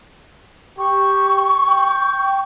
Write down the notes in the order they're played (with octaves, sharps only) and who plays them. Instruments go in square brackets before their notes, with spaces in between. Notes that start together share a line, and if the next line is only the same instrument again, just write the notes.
[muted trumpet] G4 [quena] C#6
[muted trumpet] G5